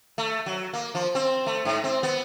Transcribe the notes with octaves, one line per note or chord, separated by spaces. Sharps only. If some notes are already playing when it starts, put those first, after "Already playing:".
A3
F#3
A#3
F3
C4
A3
G#2
C4
B3